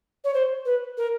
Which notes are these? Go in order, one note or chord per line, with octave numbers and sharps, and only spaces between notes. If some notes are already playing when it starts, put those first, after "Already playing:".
C#5
C5
B4
A#4